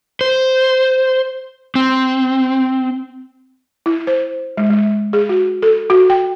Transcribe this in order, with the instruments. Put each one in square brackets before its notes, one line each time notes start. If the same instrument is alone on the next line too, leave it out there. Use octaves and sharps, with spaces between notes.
[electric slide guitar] C5
C4
[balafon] E4
C5
G#3
G#3
G#4
F#4
A4
F#4
G5